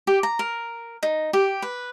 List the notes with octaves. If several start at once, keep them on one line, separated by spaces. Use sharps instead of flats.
G4
A#5
A#4
D#4
G4
B4